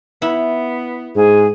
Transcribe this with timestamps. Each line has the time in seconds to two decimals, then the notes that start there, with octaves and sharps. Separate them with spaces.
0.22 B3 E4
1.16 G#2 G#4